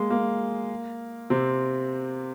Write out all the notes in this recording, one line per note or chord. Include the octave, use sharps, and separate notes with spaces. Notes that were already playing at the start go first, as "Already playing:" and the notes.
Already playing: G#3 A#3
A#3
C3 C4